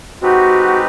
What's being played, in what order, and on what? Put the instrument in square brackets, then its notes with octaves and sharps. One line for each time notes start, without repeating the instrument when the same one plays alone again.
[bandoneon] G#3 C4 D#4 G4 B4 [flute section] F#4